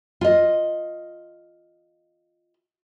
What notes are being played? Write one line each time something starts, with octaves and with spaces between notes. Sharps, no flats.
F4 D#5